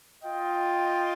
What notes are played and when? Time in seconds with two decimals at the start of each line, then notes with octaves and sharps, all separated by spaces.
0.22 F4 D#5 G5